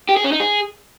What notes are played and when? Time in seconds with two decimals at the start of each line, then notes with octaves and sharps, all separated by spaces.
0.09 G4
0.17 G#4
0.24 C#4
0.32 D#4
0.40 G#4